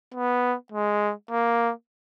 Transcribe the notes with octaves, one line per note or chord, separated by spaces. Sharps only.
B3
G#3
A#3